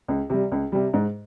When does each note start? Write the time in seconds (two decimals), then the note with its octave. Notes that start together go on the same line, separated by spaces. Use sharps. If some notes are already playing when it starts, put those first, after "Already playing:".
0.08 C#2
0.30 C3 G3
0.52 C#2
0.72 C3 G3
0.94 G#2